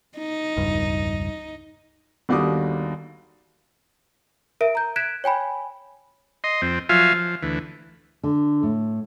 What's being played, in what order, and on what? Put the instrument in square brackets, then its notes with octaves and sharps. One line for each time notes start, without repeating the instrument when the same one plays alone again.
[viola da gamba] D#4
[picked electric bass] E1 C#2 G2
[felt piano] G1 D#2 G3 F#4 D6 D#6
[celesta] A#4 E5 D7
A#5 G6
F#6 G#6 B6 D7 E7
C#5 G5 G#5 B5
[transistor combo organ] D#5 C6
F2 C4
F3 F#3 F4 E5 F5 G#5
F3
D2 E3
[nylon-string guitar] D3
A2